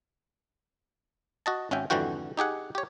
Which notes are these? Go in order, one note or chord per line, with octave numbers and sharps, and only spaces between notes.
F#4 D#5 A5
G#1 C#4 F#4 E5 G5
G#1 F2 D3 E3 F#4 G5
D#4 G4 G#4 F#5
G4 C#5